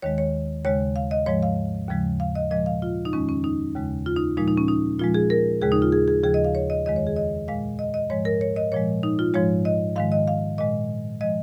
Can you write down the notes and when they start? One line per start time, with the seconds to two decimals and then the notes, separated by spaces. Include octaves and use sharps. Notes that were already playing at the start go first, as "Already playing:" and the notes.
0.02 D#2 D#3 G#3 C#5
0.18 C#5
0.65 D#2 C#3 G#3 C#5
0.96 F5
1.11 D#5
1.26 G#2 F3 G#3 C#5
1.43 F5
1.89 D#2 C#3 F3 G#3
2.20 F5
2.35 D#5
2.51 A#2 F3 G#3 D#5
2.66 F5
2.82 F4
3.05 D#4
3.13 F2 D#3 G#3 C#4
3.29 C#4
3.44 D#4
3.75 D#2 C#3 G#3
4.06 F4
4.16 D#4
4.37 A#2 F3 G#3 D#4
4.48 D#4
4.57 C#4
4.68 D#4
4.99 A#2 F3 G#3 F4
5.14 G#4
5.30 A#4
5.61 D#2 C#3 G#3 G#4
5.72 D#4
5.82 F4
5.92 G#4
6.08 G#4
6.24 D#2 C#3 F3 G#4
6.34 D#5
6.45 F5
6.55 C#5
6.70 D#5
6.86 F2 D#3 G#3 D#5
6.96 C#5
7.07 G#4
7.16 D#5
7.48 A#2 G#3 F5
7.79 D#5
7.94 D#5
8.10 G#2 F3 G#3 C#5
8.25 A#4
8.41 C#5
8.56 D#5
8.72 A#2 F3 G#3 C#5
9.03 D#4
9.19 F4
9.34 G#2 F3 G#3 C#5
9.65 D#5
9.96 G#2 D#3 G#3 F5
10.12 D#5
10.28 F5
10.58 A#2 G#3 D#5
11.21 F3 G#3 D#5